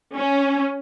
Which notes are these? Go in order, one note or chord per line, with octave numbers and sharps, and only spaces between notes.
C#4